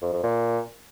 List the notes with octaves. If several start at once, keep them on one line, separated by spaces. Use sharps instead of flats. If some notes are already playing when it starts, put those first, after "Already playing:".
F2
F2
A#2